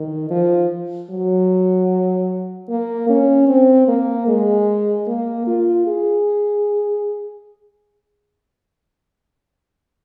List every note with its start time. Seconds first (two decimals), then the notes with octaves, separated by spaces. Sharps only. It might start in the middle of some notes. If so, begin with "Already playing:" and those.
Already playing: D#3
0.30 F3
1.10 F#3
2.69 A#3
3.09 C#4
3.48 C4
3.88 A#3
4.28 G#3
5.07 A#3
5.47 F4
5.87 G#4